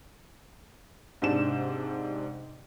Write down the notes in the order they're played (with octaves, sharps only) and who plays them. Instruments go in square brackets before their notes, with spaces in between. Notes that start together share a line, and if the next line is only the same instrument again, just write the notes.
[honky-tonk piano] G#2 C3 D4 E7